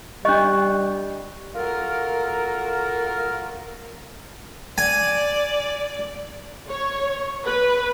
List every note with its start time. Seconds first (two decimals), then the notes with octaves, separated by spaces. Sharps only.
0.25 G3 D4 D#5 C#6 F#6
1.55 F4 F#4 A4 A#4
4.78 D5 G#5
6.69 C#5
7.45 B4